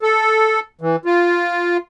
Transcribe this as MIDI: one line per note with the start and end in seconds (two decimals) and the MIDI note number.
0.02 0.60 69
0.81 0.96 52
1.05 1.77 65